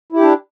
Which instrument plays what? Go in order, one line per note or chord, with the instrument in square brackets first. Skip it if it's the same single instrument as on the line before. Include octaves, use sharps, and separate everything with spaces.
[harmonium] E4
G4
D4